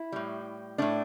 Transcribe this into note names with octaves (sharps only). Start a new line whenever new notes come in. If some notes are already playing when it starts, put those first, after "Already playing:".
Already playing: E4
A2 G3
A2 A3 D4